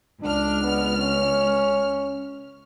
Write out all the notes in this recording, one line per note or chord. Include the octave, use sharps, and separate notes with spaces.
C#2 D4 F6
B3
C#4